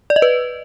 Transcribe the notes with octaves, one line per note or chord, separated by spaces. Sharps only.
D5
D#5
B4